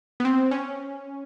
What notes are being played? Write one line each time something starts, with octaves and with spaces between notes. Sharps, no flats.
B3
C4
C#4